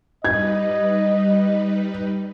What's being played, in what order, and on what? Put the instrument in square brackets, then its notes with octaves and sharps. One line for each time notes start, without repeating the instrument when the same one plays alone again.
[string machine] G3 D#4 B4 [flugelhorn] D#5 [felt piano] G#6